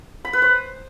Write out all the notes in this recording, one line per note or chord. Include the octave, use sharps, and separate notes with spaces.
B5
B4
C5